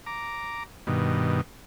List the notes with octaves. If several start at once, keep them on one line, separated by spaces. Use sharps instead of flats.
A#5 D6
G2 B2 D#3